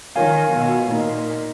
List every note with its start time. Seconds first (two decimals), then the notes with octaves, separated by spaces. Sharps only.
0.16 D#3 F4 A#4 C#5 F5 G#5
0.53 B2
0.91 A#2 D#4 A#4 D#5